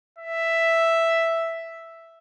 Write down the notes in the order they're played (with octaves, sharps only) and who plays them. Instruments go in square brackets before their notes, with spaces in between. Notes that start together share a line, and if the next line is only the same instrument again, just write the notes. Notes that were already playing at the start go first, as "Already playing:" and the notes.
[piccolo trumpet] E5